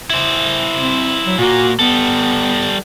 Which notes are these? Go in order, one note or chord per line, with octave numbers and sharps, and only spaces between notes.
E4 C5
C4
F#3
A#2 A#3 F#4
G3 B3 A4